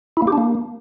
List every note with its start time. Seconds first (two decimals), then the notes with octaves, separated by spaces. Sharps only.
0.17 E4
0.22 A#3
0.27 G4
0.32 D4
0.38 A#3